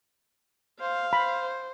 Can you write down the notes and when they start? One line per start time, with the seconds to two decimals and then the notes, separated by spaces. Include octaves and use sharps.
0.81 C5 F5
1.13 C5 B5